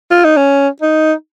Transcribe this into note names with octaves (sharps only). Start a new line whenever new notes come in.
F4
D#4
C#4
D#4